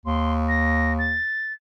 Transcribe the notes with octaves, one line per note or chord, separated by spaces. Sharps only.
D#2 C6
A#6
A6